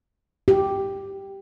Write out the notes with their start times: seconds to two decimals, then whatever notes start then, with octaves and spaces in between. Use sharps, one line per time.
0.48 G4